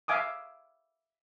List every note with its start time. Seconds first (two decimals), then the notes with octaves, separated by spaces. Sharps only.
0.08 E5 F5 G#5 D6 D#6